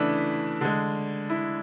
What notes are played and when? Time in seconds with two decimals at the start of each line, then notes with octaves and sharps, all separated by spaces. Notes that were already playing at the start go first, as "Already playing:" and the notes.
Already playing: C#3 E3 A3 D4 E4
0.61 D3 G#3
1.30 E4